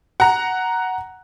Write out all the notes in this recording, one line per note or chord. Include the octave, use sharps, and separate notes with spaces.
F#5 A#5